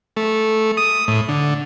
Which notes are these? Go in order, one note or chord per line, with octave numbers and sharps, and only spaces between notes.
A3
D#6
A2
D3